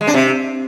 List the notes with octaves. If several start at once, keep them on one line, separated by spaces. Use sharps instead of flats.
G#3
D4
C3